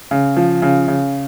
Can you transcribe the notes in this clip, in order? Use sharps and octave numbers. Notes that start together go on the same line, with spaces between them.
C#3
F3
C#3
C#3